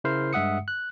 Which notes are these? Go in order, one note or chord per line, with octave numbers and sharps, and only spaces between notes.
C#3 E4 A#4 C5 F6 C7
G2 G#3 E5 F#5 D#6 C#7
F#6